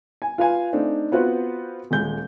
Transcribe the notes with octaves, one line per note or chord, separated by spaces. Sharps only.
G#5
F4 B4 F5 G#5
A3 C4 D4 D#4
B3 C4 F4 F#4 B4 C5
D#1 G#3 G6